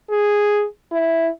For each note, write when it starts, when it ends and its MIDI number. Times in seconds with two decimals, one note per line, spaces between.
0.10 0.65 68
0.92 1.29 64